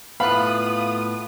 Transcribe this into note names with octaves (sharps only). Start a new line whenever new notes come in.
A2 A3 B3 F4 F5 B5 D#6 F#6